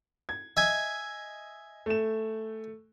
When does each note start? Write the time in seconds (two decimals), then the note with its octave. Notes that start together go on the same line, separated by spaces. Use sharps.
0.29 G#6
0.57 D#5 E5 G#5
1.86 A3 E7